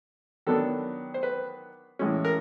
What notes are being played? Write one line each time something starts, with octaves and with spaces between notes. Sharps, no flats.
D#3 F#3 B3 D4 A4
C5
B4
A2 E3 G#3 C#4
A#4